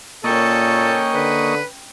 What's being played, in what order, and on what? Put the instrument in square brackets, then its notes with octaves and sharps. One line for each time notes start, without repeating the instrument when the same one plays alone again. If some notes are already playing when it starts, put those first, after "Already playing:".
[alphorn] A#2 [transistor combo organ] A#3 D#5 C#6 [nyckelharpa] C#4 G5 [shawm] A4
[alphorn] D3 [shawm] B4